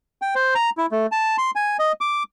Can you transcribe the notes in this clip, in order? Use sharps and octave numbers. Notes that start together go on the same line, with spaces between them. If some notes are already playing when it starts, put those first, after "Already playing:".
G5
C5
A#5
E4
A3
A5
C6
G#5
D#5
D6